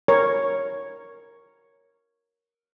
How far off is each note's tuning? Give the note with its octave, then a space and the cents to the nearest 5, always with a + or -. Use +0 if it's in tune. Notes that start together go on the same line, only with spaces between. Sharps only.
A#4 +0 C#5 +0